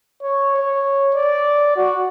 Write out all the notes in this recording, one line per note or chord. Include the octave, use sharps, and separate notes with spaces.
C#5
C#5
D5
F#4